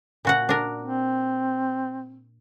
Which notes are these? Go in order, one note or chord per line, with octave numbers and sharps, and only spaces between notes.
A#2 F#4 F#5
D4 A#4
C4